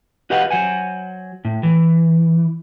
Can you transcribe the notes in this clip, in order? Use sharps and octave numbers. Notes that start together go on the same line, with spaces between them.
F#4 G4 B4 D#5 F5 F#5
F#3 C5 F#5 G#5
A2
E3